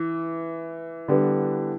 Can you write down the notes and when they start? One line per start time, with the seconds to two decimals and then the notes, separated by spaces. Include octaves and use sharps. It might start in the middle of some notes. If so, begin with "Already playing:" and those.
Already playing: E3
1.08 D3 G3 B3